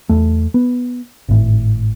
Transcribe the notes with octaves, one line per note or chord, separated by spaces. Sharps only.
E2 A3
B3
G#1 A2